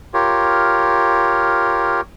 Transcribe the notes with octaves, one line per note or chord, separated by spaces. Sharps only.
F4 G4 A#4 C#5